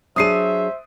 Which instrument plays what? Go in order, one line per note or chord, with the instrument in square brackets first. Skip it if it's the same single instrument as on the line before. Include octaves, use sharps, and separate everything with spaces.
[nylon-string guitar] F#3 D4 G#4 [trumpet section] C5 E5 [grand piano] D#6 C7 D#7